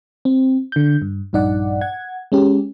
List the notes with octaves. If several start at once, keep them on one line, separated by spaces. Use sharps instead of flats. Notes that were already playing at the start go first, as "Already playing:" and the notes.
C4
D3 G6
G2
A#1 G2 D#4 D5 F#5
F#5 G#6
G#3 C#4 G4